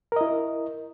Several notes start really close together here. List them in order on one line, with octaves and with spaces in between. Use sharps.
A#4 D#5 E4